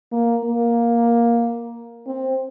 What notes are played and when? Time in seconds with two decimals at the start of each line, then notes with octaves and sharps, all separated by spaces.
0.12 A#3
0.44 A#3
2.06 C4